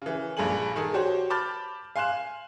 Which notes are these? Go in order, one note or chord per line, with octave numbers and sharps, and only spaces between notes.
C#3 E3
A#1 G2 G#4 A4 G#5 F#7
D#3 G#4 A4
F#4 G4 C5 C#5
A5 B5 D6 F6 G6 A6
F5 G#5 C6 F6 F#6 E7